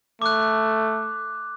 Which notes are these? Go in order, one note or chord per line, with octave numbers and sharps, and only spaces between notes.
A3 D6 F#6